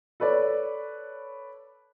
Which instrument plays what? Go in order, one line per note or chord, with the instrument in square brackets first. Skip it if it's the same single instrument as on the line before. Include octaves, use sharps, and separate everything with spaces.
[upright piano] A4 B4 C#5 D5